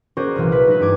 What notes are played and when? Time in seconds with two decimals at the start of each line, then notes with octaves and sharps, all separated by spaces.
0.17 C#4 F#4 G#4 A#4 C5 D5
0.36 C2 A#2 E3 F#3
0.52 B4
0.66 F#3 G#3 D#4 E4 B4
0.80 G2 G3 D6 G#6